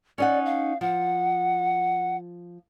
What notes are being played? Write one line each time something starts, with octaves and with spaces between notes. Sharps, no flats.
C#4 D#4 D5 F#5
F5
F3 F#5